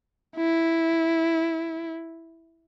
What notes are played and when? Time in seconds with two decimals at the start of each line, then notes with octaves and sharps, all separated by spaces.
0.37 E4